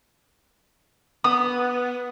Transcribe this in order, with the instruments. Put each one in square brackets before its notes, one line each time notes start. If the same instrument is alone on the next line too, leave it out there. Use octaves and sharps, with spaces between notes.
[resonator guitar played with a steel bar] B3 [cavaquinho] D#6